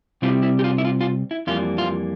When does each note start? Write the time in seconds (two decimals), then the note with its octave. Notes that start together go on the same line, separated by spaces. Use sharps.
0.22 C3 G3 C4 E4 F4
0.43 E4
0.59 G4
0.64 F4
0.78 E4
0.85 F4
1.01 F4
1.31 E4
1.47 F2 E3 G3 A#3 F4
1.78 F4